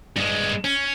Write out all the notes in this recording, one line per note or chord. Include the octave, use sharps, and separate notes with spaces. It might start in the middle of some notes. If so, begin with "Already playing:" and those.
G2 G#3
C#4